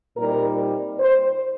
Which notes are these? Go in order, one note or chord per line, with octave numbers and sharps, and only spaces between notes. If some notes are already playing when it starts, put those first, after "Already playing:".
A#2 G3 C4 D#4 A#4
C5